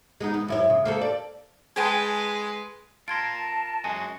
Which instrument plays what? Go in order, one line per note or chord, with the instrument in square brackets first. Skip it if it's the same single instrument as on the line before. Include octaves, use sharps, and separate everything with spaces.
[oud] G#3 B3 D#4
B3
F#2 E4 C#5
C#3
A#3 C4 A4
D5
[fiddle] G#3 B4 [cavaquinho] G#4 G5 A5
[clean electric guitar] F4 A#4 [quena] A5 [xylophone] C6 G#6 D7
[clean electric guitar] F#2 G#3 F#4 [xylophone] G#5